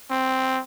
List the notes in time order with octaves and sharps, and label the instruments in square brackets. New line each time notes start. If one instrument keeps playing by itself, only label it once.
[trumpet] C4